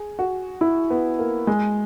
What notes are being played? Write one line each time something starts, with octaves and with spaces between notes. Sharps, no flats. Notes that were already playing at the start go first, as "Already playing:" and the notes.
Already playing: G#4
F#4
E4
B3
A#3
G#3